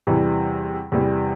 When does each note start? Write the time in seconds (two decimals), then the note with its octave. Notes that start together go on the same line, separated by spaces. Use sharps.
0.07 E2 C3 E3 G3
0.92 E2 C3 E3 G3